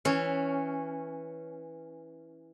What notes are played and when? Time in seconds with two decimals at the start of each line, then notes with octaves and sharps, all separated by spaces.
0.05 E3 C#4